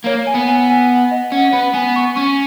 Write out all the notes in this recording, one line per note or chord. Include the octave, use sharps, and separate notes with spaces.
A#3 C#5
G#5
B3
G#5
G#5
F#5
D#5
C#4 F#5
B3 B5
B3 G#5
C#6
C#4 C#6